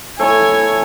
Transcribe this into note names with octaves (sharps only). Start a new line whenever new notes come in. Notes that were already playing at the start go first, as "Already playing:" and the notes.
A3 E4 C#5 G#5